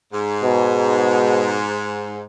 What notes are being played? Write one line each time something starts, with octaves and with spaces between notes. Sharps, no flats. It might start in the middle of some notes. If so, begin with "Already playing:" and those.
G#2
B2